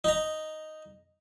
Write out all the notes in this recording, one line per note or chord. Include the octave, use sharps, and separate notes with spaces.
D#4 A#5